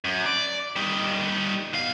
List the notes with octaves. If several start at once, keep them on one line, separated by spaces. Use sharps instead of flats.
F#2
D5
G3 D#4
B2 F5